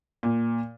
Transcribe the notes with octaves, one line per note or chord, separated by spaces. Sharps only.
A#2